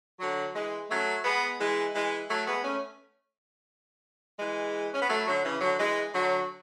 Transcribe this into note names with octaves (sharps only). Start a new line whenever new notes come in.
D3 F#3
E3 G#3
F#3 A3
G#3 B3
E3 G#3
E3 G#3
F#3 A3
G#3 B3
A3 C#4
E3 G#3
C#4
B3
F#3 A3
D3 F#3
C#3 E3
D3 F#3
E3 G#3
D3 F#3